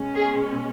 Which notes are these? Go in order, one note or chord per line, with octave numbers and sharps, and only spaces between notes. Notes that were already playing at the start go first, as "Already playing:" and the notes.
Already playing: B2 G#3 C#4
G#4